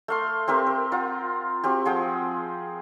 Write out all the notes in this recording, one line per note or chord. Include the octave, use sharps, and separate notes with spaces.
A3 F5 C6
C4 G4 A#4 E5
A#4
F4 F#5
C4 F#4 G4
F3 G#4 F#5 G5